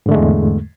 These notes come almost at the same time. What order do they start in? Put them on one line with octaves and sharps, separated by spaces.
G#2 D3 A3 G#3 E2